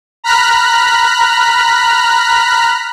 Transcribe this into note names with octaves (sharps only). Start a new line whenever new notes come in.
A#5 B5 F6 F#6 B6